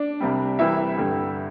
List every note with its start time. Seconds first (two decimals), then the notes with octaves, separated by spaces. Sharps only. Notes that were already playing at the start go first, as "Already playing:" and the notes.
Already playing: D4 D5
0.20 C2 C3 G3
0.59 C2 C3 E3 G3 E4 E5
0.98 G2 D3 G3